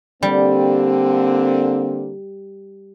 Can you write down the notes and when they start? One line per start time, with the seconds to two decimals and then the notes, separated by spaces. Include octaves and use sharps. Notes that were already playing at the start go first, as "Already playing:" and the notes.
0.23 D3 G3 A#3 C4